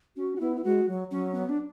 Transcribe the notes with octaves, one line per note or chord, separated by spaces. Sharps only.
C#4 F#4
F#4
B3 E4
E4
G#3 F#4
F#3
F#3 C#4
B3
D4